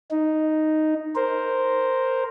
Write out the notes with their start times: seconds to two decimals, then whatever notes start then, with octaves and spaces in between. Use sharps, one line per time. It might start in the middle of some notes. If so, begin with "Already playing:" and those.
0.11 D#4
1.15 A#4 C5